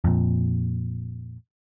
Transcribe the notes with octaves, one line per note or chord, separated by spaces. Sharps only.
F2 A#2